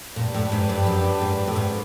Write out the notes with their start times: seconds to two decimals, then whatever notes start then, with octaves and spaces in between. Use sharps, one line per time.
0.16 A#2 D4 G4 B4
0.34 A2
0.52 G#2
0.69 G2
0.87 F#2
1.22 G#2
1.47 A2
1.56 G#2